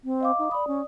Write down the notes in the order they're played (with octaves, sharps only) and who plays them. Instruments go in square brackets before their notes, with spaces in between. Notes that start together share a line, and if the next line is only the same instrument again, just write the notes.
[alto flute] C4
[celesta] D#5 F5 D6
[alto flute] D#4
[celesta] D5 D#6 [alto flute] B5
[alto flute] C#4